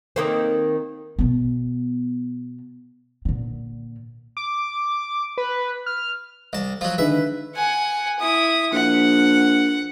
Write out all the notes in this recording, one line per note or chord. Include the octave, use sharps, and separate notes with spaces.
D#3 A#3 C4
B2 B3
A#2 D3
D6
B4
F6
C2 A5
F3 F#3
D3 D#3 G#3 B4 E5
F#5 G#5
E4 D#6
A#1 F#5